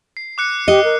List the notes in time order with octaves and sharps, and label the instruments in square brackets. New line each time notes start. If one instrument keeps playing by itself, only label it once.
[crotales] C7
D6 F#6 C#7
[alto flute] G4 [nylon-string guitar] D#5
[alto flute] A#4